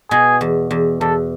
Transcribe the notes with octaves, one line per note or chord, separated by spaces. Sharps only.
B2 G#4
E2
E2
E2 A4